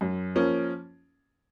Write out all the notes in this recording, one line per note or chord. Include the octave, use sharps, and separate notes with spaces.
F#2
F3 A#3 C#4